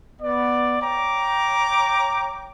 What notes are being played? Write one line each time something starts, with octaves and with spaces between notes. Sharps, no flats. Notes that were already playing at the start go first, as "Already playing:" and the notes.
B3 D5
C#5 G5 A#5 D6